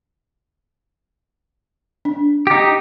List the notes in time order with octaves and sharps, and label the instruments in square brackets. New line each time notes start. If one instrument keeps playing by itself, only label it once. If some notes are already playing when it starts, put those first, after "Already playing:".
[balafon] D4
[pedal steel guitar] D#4 G4